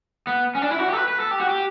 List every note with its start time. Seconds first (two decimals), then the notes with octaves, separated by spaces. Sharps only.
0.27 B3
0.55 C#4
0.62 D4
0.71 E4
0.79 F#4
0.88 G4
0.93 A4
0.96 B4
1.08 B4
1.20 A4
1.31 G4
1.40 F#4
1.49 G4